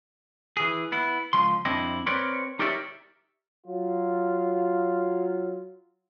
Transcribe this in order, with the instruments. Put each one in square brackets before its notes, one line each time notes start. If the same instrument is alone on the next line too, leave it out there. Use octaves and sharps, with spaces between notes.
[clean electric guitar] E3 G#4
B3 E4
C#2 F3 C6
F2 C4 D4 E4 D#5
C4 A#4 B4 C#5 D5
D#4 G4 A#4 C#5 D5 E5
[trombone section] F#3 F4